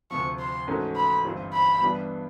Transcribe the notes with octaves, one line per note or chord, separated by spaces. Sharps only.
D2 C3 F3 C#6
C6
G#2 E3 A3 C#4 F#4
B5
G1 G2 E3 G3 C4
B5
G2 E3 G3 B3 D4